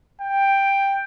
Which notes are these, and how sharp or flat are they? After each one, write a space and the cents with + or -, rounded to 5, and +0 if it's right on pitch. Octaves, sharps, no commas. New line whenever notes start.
G5 +10